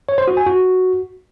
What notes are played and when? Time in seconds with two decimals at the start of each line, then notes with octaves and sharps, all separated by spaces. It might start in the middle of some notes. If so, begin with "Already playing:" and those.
0.09 C#5
0.18 C5
0.28 F#4
0.37 G#5
0.47 F#4